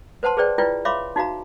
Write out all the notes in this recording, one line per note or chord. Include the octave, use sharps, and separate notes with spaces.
B4 C5 F#5 A5 C6
G#4 B4 C5 D5 G5
E4 F4 B4 D5 G5
C#5 E5 F5 B5 C6 D6
D#4 F#4 F5 A#5